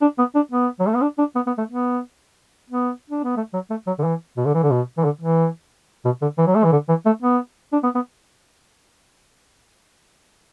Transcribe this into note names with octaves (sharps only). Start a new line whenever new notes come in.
D4
B3
D4
B3
F#3
A3
B3
D4
D4
B3
B3
A3
B3
B3
D4
B3
A3
F#3
A3
F#3
D3
E3
B2
D3
E3
D3
B2
E3
D3
E3
B2
D3
E3
F#3
A3
E3
D3
E3
A3
B3
D4
B3
B3